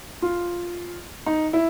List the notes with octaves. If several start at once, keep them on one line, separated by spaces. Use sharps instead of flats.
F4
D#4
E4